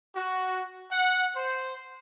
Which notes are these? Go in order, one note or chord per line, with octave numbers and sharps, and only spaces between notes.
F#4
F#5
C5